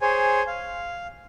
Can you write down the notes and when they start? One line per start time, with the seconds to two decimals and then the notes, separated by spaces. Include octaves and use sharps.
0.01 G#4 C5 C#5 G#5
0.47 F5